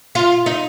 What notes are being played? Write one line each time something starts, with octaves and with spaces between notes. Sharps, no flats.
F4
D#4